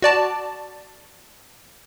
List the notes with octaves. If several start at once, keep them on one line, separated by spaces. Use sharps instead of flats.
F#4 D5 A5